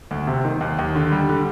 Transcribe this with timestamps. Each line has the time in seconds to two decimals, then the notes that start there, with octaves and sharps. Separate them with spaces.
0.11 D2
0.27 C3
0.45 D#3
0.61 D#2
0.79 D#2
0.95 D3
1.12 G3
1.29 D3